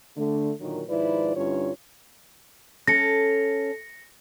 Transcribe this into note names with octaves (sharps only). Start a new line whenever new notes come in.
D3 A3
A#2 D3 D#3 F#3 A#3
G#2 D#3 F3 E4 B4 D5
G2 D3 C#4 E4 F4 C#5
C#4 A4 A#6 C#7